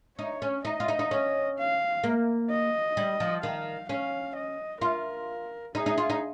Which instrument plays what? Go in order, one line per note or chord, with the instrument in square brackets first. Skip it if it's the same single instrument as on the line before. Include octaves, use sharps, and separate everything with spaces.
[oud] D#4 [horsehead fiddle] C#5
[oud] C#4
[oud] D#4 [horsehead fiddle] D#5
[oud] F4
D#4
D#4
C#4
[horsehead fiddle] F5
[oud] A#3
[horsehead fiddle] D#5
[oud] G3
F3
[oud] D#3 [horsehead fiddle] F5
[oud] C#4 [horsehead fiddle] F5
[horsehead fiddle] D#5
[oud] F4 [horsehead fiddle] A#4
[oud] D#4 [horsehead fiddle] G#4
[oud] D#4
F4
D#4